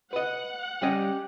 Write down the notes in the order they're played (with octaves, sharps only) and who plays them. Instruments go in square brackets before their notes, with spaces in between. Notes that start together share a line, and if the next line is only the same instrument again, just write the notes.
[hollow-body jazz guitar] B4 D#5 [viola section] F#5
[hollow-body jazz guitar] G3 C#4 D#5 [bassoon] G4